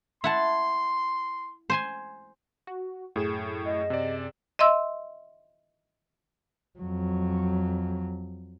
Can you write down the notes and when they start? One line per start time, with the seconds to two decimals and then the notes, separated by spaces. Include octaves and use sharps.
0.24 E4 F#5 A5 C6
1.70 C5 G#5 C6
2.67 F#4
3.16 F#2 A2 G#4 E7
3.65 D#5
3.90 C3 D5
4.59 D#5 E5 C6 E6
6.79 F2 F#3